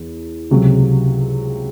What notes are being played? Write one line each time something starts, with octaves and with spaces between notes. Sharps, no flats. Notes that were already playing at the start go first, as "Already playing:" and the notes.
Already playing: E2
C#2 C3 F#3